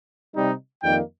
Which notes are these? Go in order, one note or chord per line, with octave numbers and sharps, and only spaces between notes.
C3 G3 D#4
F2 D#3 G3 A#3 D#4 G5